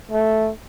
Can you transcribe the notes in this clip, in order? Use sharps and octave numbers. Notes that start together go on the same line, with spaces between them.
A3